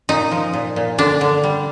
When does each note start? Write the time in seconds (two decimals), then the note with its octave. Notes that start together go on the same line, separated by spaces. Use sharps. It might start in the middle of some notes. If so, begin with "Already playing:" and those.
0.09 A#2 D#4
0.31 F3
0.54 A#2
0.76 A#2
0.98 D3 D4
1.21 D3
1.44 G3